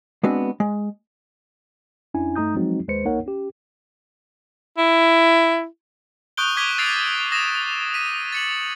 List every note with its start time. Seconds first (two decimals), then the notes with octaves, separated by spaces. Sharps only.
0.23 G#3 B3 C4 D4 F#4
0.60 G#3
2.14 F2 C#4 D4 E4 G#5
2.36 G2 A3 D#4 A#5 D#6 G6
2.55 F3 F#3 G#3 C4 D#4 F#4
2.88 D#2 G#3 B4 C5 C#7
3.05 C2 A#3 D#4 A#4 C#5 F#5
3.26 C#4 G4
4.78 E4
6.37 C#6 D#6 F#6 G6 D7 G7
6.56 C#6 D6 G#6 B6 D#7 G7
6.78 E6 A6 C7 D7 F7
7.32 D#6 A#6 E7
7.94 B6 D#7
8.32 A6 C#7 F#7